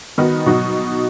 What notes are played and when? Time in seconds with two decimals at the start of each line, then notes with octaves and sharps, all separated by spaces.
0.18 D#3 B3 D#4 F#4
0.46 B2 F#3 D#4 F#4